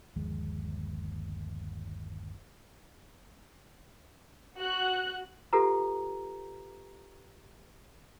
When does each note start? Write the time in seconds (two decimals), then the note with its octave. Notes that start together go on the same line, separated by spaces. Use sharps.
0.16 G1 D#2 F3 G#3
4.57 F#4 F#6
5.53 F4 G4 A4 B4 A#5